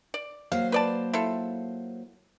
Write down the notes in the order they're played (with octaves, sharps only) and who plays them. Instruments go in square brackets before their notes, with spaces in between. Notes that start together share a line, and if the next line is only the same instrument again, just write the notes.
[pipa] D5
[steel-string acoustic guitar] F#3 A#3 C5 [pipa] F5
[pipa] B4 D5 A5
E4 F4 A4